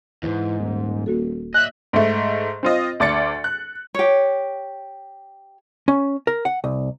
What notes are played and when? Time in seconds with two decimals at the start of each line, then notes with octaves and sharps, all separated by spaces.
0.23 D#2 G#2 E3
0.60 D#1
1.06 A#3 F#4 A4
1.54 D#5 E5 G#5 F#6 G6
1.93 G#2 A3
2.63 C4 F4 D#5
3.00 D2 D5 A6 C#7
3.44 F#6
3.95 G4 C#5
5.88 C#4
6.27 A#4
6.45 F#5
6.64 C2